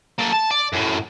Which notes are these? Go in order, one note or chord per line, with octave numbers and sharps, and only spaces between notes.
A#3 A4
A5
D5
F#2 A2